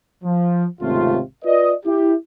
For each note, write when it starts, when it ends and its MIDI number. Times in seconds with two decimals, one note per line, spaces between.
0.24 0.66 53
0.82 1.20 32
0.82 1.20 37
0.82 1.20 48
0.82 1.20 57
0.82 1.20 65
1.45 1.72 65
1.45 1.72 71
1.45 1.72 74
1.45 1.72 75
1.85 2.14 64
1.85 2.14 67